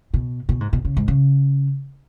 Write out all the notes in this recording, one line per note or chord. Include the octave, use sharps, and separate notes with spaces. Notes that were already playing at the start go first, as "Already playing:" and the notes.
B2
B2
G#2
B2
C#3
G#2
C#3